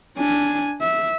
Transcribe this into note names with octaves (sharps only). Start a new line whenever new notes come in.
D4 G#5
E5